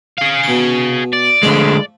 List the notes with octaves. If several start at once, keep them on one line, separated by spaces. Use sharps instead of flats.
G#4 F5
B2 D6
D5
D3 F3 G#3 A3